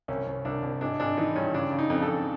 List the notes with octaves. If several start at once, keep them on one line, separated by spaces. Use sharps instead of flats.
C2 C#4
C2
C2 D4
C2
G#1 D4
G#1 D4
E3 D#4
G2 C#4
C#3 D4
C#3
D#4
F2
A4
F2